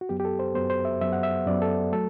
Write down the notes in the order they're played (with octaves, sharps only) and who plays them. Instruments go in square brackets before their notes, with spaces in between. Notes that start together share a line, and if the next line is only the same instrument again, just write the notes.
[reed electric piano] F#4
F#2 F#3 B3 G4
G4
A4
C5
F#2 F#3 B3 C5
C5
E5
F#2 F#3 B3 E5
F#5
E5
F#2 F#3 B3 D5
A4
F#3 A3 A4